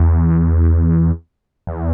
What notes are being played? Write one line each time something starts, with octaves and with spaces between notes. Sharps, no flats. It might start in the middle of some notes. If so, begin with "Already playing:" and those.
Already playing: E2
E2